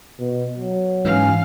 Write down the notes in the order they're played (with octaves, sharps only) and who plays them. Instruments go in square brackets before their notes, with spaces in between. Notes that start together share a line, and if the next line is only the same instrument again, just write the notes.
[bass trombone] B2
F#3
[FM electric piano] G#2 E3 [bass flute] C#4 [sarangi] F5